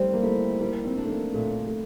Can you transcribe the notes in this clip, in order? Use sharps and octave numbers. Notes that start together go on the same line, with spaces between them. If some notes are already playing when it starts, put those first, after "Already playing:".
Already playing: G3 A3 C4
A#3
A3 E4
G3 A#3
C4
D4
A3
A#3
A#2 A3
A3